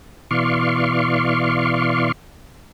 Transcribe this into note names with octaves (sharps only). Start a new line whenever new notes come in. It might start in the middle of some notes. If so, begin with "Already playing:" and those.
B2 E3 D5 F5 C6 C#6